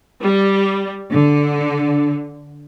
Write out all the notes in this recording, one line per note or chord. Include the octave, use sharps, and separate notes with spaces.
G3
D3